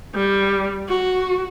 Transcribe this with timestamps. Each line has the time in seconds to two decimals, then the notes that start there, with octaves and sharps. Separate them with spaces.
0.14 G3
0.89 F#4